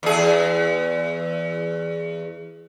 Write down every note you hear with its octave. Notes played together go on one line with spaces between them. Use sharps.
E2 G#4